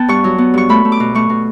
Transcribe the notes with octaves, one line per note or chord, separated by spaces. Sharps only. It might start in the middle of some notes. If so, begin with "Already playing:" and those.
Already playing: B3 G5 A5
G2 C#6
F#3
B3
G2 C#6
A3 B5
A3
D6
B2
A3 C#6
B2